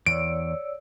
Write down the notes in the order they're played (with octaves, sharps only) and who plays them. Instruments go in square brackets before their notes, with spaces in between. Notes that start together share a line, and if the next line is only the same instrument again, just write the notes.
[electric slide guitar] E2 [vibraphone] C#5 D5 E6 [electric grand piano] D7